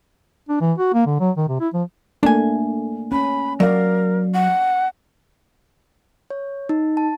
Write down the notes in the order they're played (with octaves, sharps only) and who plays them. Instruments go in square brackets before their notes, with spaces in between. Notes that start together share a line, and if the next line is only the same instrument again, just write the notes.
[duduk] D4
E3
F#4
A#3
D3
F#3
D#3
C3
E4
F3
[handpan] A3 A#3 [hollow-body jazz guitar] D4 G#5
[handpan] C#4 [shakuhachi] B5
[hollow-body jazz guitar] F#3 [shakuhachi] A#4 [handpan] D5 F5
[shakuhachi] F#5
[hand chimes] C#5
D#4
A5